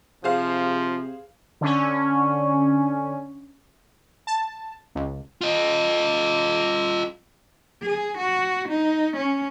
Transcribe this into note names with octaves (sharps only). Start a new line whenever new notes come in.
C3 F3 G#4 C5 F5
D3 C#4
A5
C#2
F4 D#5
G#4
F#4
D#4
C#4